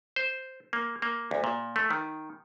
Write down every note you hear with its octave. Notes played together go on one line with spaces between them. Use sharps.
C5
A#3
A#3
D2
A#2
A3
D#3